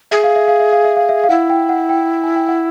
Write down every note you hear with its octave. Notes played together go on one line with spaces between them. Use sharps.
G#4 E5
F5
E5
F5
E5
F5
E5
F5
E5
F5
E4 F#5
G5
F#5
G5
G#5
G5
F#5